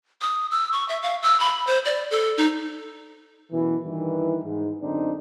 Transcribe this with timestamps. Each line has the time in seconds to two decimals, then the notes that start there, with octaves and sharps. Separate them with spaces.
0.22 D#6
0.51 E6
0.72 C#6
0.89 E5
1.02 F5
1.23 E6
1.40 B5
1.67 C5
1.85 D5
2.11 A4
2.37 D#4
3.52 F#2 B2 E3
3.84 G2 D#3 E3
4.43 G#2
4.81 F#2 D3 C4 D4 D#4